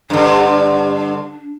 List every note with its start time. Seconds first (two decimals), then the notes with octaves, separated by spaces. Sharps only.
0.10 G2 D3 D4